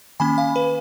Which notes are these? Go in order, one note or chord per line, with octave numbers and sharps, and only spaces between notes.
D#3 A#3 C#4 G#5 B5
F5 G#5
B4